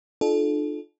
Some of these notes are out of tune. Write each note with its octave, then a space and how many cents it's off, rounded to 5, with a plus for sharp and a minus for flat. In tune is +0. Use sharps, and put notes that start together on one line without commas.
D4 +40 F4 +0 A4 -30